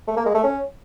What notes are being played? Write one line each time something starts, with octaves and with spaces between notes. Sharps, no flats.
A3
A#3
G#3
A3
C#4